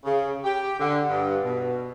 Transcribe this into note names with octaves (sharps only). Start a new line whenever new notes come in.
C#3
G4
D3
G2
B2